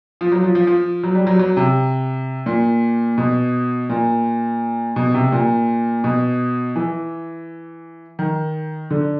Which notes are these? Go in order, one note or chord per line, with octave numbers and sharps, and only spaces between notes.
F3
F#3
F3
F3
F3
F#3
G3
F#3
F#3
C3
A#2
B2
A#2
B2
C3
A#2
B2
E3
D#3
D3